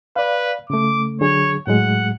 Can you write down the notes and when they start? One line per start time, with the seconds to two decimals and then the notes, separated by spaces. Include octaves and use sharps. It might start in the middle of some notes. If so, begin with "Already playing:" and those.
0.16 B4 D5 F5
0.70 C#3 A3 D6
1.21 D3 F#3 G#4 C#5
1.67 A2 F#3 G#3 F#5